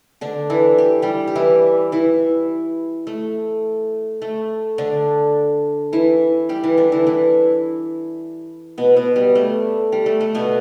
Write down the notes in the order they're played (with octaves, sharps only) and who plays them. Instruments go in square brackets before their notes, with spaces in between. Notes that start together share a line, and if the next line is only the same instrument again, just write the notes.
[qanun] D3 D4
E3 E4
G4
G3 G4
G4
E3 E4
E3 E4
A3
A3
D3 D4
E3 E4
G3 G4
E3 E4
D3 D4
E3 E4
E3 E4
B2 B3
B2 B3
G3
A3
G3
A3
A3
B2 B3